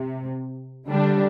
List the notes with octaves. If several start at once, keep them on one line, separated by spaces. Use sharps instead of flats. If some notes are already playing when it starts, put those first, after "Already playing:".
Already playing: C3
D3 G3 D4